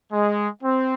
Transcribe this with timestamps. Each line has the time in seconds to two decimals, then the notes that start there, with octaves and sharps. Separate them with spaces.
0.13 G#3
0.64 C4